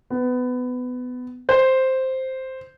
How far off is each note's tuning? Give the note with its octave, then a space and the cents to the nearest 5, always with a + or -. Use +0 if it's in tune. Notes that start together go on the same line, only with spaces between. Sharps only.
B3 +20
C5 +0